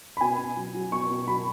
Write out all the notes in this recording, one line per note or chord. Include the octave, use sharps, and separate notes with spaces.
B5
B2 G#5
B2
F#3
F#3
B2 C#6
B2
F#3 B5